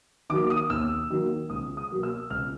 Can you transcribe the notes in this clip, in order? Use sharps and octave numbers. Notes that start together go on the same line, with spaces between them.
D#3 F#3 A#3 D6
D#6
D#2 E6
D#3 F#3 A#3
C#2 D#6
D#6
B2 F#3 A#3
E6
C#2 F6